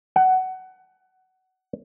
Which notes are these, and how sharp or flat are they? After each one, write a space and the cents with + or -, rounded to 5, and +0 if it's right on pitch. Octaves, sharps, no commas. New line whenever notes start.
F#5 +20